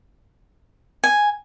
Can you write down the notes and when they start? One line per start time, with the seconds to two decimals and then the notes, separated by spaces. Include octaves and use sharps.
1.04 G#5